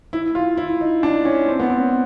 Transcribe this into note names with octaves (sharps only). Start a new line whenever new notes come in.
E4
F4
E4
D#4
D4
C#4
C4
B3
C4